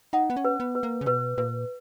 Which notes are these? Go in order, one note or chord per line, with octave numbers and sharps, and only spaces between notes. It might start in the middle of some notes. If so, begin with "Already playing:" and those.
D#4 F#5
B3
C#4
B4
B3
B4
A#3
C#3
B2 B4
A#2 B4